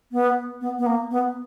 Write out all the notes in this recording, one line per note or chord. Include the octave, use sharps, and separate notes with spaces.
B3
B3
B3
A#3
B3